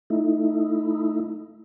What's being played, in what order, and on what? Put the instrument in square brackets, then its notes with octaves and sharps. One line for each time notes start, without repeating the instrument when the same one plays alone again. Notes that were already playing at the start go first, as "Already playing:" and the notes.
[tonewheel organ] A3 D#4 E4